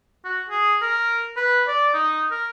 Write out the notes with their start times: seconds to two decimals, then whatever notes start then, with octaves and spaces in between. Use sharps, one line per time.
0.25 F#4
0.49 G#4
0.82 A#4
1.37 B4
1.68 D5
1.94 D#4
2.31 A#4